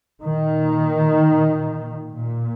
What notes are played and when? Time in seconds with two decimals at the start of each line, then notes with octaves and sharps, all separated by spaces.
0.23 A#2 D#3
2.11 A#2